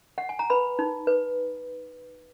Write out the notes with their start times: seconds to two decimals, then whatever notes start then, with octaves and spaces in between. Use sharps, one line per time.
0.18 F#5
0.29 G#5
0.39 A#5
0.50 B4 B5
0.79 D#4
1.07 B4